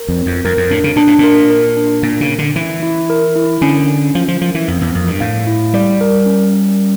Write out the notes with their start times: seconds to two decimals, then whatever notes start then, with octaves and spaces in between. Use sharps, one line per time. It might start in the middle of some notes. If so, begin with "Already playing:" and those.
Already playing: A#4
0.08 F2
0.18 C#5
0.26 F2
0.45 F2 A#4
0.57 F2
0.71 A2 D4
0.84 C#3
0.96 A#2 D4
1.07 A2
1.19 A#2 A#4
1.50 A#4
1.77 D4
2.03 A#2 A#4
2.21 C#3
2.29 C#4
2.38 D3
2.56 E3 E4
2.82 E4
3.10 A#4
3.35 E4
3.61 D3 C#4
3.88 C#4
4.15 F3 F5
4.28 F3
4.41 F3 A#4
4.55 E3
4.68 F2 F5
4.81 E2
4.94 F2 A#4
5.07 G2
5.20 A2 F5
5.47 E4
5.74 G3 D5
6.01 A#4
6.26 C#4
6.54 C#4
6.79 C#4